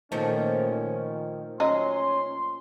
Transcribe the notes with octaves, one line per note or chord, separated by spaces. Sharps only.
A#2 D#3 F3 A3 C#4
D#3
F#3 C#4 D#4 C6